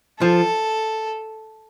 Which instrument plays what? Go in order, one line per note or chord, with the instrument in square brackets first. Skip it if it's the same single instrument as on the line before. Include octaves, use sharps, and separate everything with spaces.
[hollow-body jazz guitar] F3 [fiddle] A4